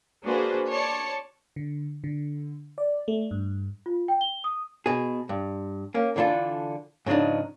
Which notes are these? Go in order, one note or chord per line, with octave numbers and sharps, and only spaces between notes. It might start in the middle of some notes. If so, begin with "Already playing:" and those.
A#3 D4 F#4 G#4 B4 C5
C#5 D5 A5 C6 C#7
D3
D3
D5
A3
G2
F4
G5
G7
D#6
B2 G#4
G2
A#3 C#4
D3 E3 D4 F4 A4
G#2 C#3 F3 D4 D#4